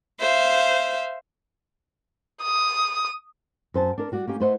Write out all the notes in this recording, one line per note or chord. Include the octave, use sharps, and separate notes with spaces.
C5 E5 F5
D#6
F#2 C5 A5
D4 A#4
G3 F#4 D5
A#3 C#4 G4
A3 E4 B4 C5 D#5 F#5